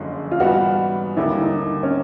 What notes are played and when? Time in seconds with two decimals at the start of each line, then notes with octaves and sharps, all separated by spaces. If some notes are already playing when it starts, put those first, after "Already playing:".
Already playing: F#1 F#2 D3 F3 G#3
0.32 F4
0.40 G#2 E3 G3 B3 E4 F#4
1.17 D#2 D3 G3 A#3 E4
1.42 D#4
1.83 C#4